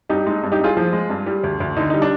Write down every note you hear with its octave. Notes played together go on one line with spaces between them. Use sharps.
G2 D#4 G4
G#3 D#4
G2
D#4 G4
G2 F4 G#4
F3
G#3
G2
G3
D2
D2
D3 D#4
G3 D#4
D4